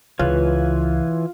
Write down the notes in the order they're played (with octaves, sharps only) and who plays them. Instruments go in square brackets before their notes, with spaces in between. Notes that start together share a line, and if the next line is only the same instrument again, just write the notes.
[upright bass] C#2 [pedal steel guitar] E3 B4 C#5 [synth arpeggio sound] F4